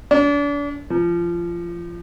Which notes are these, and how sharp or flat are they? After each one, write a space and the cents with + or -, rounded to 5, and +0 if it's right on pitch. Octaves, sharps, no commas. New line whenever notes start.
D4 -35
F3 -25